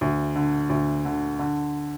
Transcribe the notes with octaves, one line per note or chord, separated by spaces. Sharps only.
D2
D3
D2
D3
D3